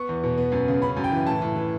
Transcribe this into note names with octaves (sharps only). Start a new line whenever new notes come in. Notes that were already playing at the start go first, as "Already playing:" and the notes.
Already playing: B3 C#6
E2
B2
B3
F#2
C#3
C#4 B5
F#2
G5
E3
A2 A5
A2
E3